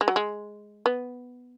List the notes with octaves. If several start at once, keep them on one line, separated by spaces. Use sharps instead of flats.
G#3
F#3
G#3
B3